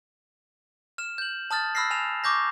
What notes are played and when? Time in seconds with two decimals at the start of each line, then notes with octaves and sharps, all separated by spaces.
0.98 F6 E7
1.18 G6 F#7
1.51 A5 D#6 F6 A6
1.75 B5 E6 F6 A#6 C7
1.91 G#5 E7 F7
2.24 C#6 D6 G6 A#6